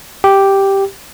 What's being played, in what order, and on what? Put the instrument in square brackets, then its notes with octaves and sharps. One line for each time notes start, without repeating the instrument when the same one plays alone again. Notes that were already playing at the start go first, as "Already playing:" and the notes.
[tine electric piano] G4